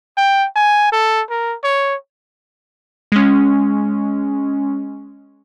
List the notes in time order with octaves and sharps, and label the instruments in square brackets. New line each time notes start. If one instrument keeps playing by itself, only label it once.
[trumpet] G5
G#5
A4
A#4
C#5
[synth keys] G#3 C#4